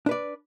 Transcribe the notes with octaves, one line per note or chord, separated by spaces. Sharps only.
D4 B4 D5